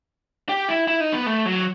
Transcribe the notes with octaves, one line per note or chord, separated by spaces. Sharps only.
G4
E4
E4
D#4
B3
A3
F#3